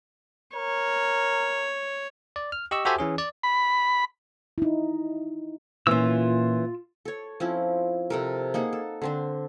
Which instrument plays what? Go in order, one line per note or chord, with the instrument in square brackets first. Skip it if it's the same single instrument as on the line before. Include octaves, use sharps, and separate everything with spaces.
[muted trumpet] A#4 [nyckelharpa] C#5
[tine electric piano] D5
F6
G4 D#5 C#6 E6
F#4 G4 A4 C5 E5 G#5
E3 C#4 G#4
D5
[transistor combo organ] B5
[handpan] D#4 E4
[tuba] A#2 [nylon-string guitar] E3 C#4 [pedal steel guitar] F4 E6
[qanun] A4 C#5
F3 C4 C#4 E4
C3 A4 A#4
A#3 D#4 G#4 F#5
A4
D3 C4 D4